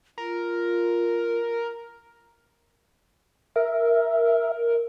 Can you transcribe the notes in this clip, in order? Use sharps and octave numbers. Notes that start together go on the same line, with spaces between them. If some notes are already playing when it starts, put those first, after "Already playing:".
F4 A#4
A#4 E5